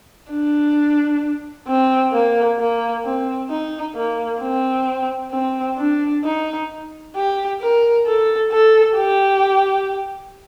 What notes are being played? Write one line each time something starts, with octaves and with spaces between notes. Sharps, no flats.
D4
C4
A#3
A#3
C4
D#4
A#3
C4
C4
D4
D#4
G4
A#4
A4
A4
G4